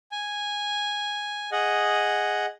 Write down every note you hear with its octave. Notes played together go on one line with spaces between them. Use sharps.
G#5
G#4 D#5 F#5